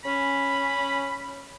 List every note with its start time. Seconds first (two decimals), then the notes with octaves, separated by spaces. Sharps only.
0.05 C#4 B5